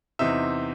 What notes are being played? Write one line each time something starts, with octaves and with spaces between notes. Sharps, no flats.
E2 C3 E3 C4 D#4 E5